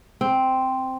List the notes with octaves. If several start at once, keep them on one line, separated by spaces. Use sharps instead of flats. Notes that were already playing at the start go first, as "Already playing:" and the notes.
C4